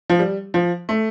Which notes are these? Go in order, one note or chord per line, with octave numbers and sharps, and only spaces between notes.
F3
G3
F3
A3